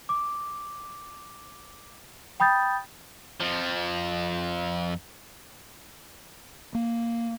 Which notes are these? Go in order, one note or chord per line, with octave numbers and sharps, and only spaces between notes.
D6
G5 B5 D#6 G6 A6
F2 F3
A#3